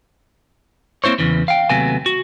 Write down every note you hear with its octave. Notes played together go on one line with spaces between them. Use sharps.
A#3 C4 E4 C5 C#5
E2 G#2 C#3 E3
F5 G5
D#2 C3 F#3 A3 B3 G#5
F#4